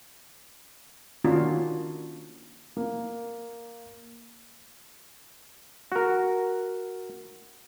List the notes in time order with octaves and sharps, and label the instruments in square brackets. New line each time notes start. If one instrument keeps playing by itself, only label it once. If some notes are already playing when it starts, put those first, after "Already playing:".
[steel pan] D#3 A#3 C#4 D4 F4 F#4
[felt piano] A#3
[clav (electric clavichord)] F#4 A#4